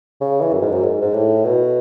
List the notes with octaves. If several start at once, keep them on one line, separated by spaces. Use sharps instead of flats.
C#3
E3
F#2
G#2
F#2
G#2
G#2
A2
B2